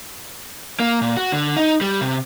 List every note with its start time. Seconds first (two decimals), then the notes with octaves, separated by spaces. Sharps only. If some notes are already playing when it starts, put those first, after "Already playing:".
0.80 A#3
1.01 A#2
1.17 F#4
1.32 D3
1.57 D#4
1.81 G3
2.01 C3